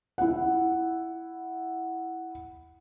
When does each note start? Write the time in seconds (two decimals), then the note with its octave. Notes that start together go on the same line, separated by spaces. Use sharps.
0.18 E4 F#5